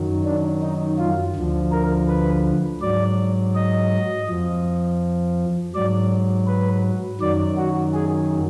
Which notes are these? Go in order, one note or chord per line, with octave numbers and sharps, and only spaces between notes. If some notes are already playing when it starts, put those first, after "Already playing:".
Already playing: F#2 D#3 F#3
D4
D#4
F4
D2 D3 F3
A#4
B4
G#2 F#3 D5
D#5
F2 F3
G#2 F#3 D5
B4
F#2 D#3 F#3 D5
F#4
G#4